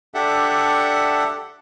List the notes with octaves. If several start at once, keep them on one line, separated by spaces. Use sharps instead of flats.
D4 G4 A4 E5 F#5